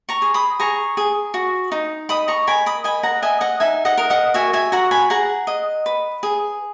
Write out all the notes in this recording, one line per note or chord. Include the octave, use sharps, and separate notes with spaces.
A#5 C#6
G#4
B5 D#6
G#4 A#5 C#6
G#4
F#4
D#4
D#5 B5 D#6
A#5 C#6
A#4 G#5 B5
B5 D#6
D#5 G#5 B5
F#5 A#5
D#5 E5 G#5
D#5 F#5
D#4 E5 G#5
D#5 F#5
A#4
D#5 F#5
F#4 E5 G#5
E5 G#5
F#4 F#5 A#5
G#5 B5
G#4 F#5 A#5
D#5
B4
G#4